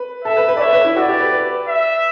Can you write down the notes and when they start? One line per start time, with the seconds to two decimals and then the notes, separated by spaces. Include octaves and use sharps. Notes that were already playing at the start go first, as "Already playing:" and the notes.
Already playing: B4
0.25 A4 E5
0.37 B4
0.48 B4
0.57 D5
0.60 C#5 E5
0.73 B4
0.85 E4
0.97 F#4 D5
1.09 G4
1.20 B4
1.32 B4
1.68 E5